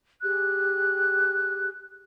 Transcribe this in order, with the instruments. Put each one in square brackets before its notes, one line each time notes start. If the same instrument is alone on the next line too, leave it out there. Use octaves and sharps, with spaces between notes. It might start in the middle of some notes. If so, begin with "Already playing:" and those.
[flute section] G4 G#4 F#6